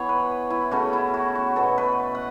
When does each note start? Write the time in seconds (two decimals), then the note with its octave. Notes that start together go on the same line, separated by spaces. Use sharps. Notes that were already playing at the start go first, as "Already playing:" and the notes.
Already playing: E3 B3 C#5
0.09 B4
0.50 E4
0.71 C#3 A3 C#4 F#4
0.93 E4
1.14 F#4
1.35 F#4
1.56 B2 B3 A4
1.78 B4
2.15 F#5